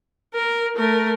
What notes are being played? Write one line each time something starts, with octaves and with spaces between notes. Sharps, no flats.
A#4
A3 A#4